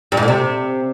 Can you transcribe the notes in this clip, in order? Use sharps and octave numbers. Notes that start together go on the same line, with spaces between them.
G2
G#2
A2
C3